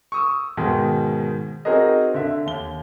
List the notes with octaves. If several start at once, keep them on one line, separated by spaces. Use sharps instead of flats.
C#6 D#6 E6
G#2 B2 D#3
C4 D#4 F#4 G#4 A#4 D#5
D3 E5
D#2 G7